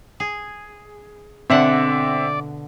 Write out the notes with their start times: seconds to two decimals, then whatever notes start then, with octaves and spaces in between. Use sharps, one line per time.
0.20 G#4
1.50 B2 D3 C4 D5 E5 F#5